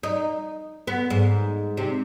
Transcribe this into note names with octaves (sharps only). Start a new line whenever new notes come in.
D#4
B3
G#2
C3